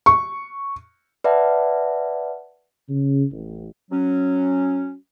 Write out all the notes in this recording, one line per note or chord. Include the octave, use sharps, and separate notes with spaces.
C#6
B4 D5 E5 F#5 A5
C#3
A1
F#3 C#4